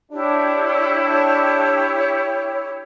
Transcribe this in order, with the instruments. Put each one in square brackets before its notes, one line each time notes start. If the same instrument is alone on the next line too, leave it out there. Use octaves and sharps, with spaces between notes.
[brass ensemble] D4 [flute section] E4 G4 C#5